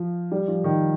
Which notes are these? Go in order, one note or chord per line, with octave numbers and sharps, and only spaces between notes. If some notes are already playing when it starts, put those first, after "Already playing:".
Already playing: F3
G3
F3
D#3